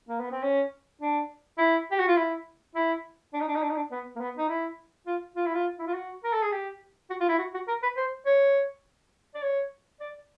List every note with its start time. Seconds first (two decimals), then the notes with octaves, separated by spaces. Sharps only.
0.09 A#3
0.20 B3
0.31 C4
0.43 C#4
1.01 D4
1.58 E4
1.91 G4
1.99 F#4
2.08 F4
2.16 E4
2.75 E4
3.33 D4
3.40 D#4
3.48 D4
3.55 D#4
3.62 D4
3.69 D#4
3.76 D4
3.91 B3
4.16 A#3
4.20 B3
4.37 D#4
4.48 E4
5.06 F4
5.36 F4
5.46 E4
5.55 F4
5.79 E4
5.87 F4
5.94 F#4
6.24 A#4
6.33 A4
6.42 G#4
6.52 G4
7.10 F#4
7.20 F4
7.29 E4
7.39 F#4
7.54 F#4
7.68 A#4
7.83 B4
7.97 C5
8.26 C#5
9.35 D5
9.42 C#5
10.00 D5